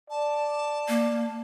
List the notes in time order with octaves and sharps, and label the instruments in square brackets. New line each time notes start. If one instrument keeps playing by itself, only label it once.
[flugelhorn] D5 [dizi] A5
[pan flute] A#3